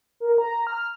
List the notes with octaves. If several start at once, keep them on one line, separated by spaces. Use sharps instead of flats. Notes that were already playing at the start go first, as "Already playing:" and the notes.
A#4
A#5
F6